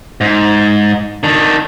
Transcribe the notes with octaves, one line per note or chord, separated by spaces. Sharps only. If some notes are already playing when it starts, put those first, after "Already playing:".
G#2
D#3 D4